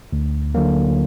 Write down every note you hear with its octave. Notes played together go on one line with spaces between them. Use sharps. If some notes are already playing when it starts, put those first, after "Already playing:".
D2
D3 F#3 A#3